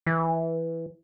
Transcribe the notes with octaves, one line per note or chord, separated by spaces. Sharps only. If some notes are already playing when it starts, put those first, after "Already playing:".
E3